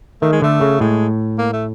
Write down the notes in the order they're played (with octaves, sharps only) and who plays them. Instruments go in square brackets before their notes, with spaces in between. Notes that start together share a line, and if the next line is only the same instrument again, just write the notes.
[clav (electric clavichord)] D#3 [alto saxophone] A3
[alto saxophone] G#3
[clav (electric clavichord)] D3 [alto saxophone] A3
[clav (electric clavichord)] C#3
[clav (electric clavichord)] A2 [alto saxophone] G#3
[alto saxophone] A#3
A3